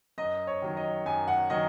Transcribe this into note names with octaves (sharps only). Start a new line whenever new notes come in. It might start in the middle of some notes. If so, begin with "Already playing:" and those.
F#2 D#5
C#5
D#3 F#3
D#5
F#2 G#5
F#5
D#3 F#3 D#5